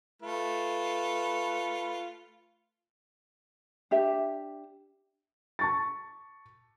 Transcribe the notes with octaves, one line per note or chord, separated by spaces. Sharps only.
A3 F4 B4
D4 G4 E5
A5 C#6 A6